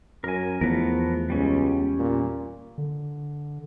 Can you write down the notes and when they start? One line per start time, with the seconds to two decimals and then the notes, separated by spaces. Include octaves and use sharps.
0.24 F#2 A#4 G#5
0.61 E2 F3 A3 B3 A#4
1.30 C#2 G3 C#4
1.99 A#2
2.78 D3